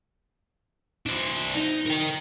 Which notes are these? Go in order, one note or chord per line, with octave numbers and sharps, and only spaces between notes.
D4 C5
D#4
A#4 G5